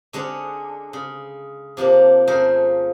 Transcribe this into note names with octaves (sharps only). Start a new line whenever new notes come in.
D3 G#3 C#4 D4
C#3
C3 F3 A#3 D4
F2 C#3 A3 A#4 C5